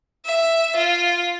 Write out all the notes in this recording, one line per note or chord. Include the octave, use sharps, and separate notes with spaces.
E5
F4